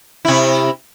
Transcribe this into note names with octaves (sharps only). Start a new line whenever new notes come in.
C3 E4